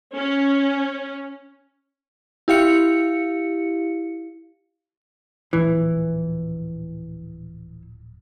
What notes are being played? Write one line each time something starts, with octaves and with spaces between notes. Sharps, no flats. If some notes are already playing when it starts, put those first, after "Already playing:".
C#4
E4 G4 F5 C#7
D1 A#1 E3